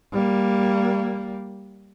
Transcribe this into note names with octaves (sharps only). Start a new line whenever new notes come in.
G3 A#3